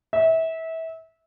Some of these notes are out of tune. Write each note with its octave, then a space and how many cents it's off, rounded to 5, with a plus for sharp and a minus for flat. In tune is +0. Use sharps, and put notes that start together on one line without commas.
E5 -25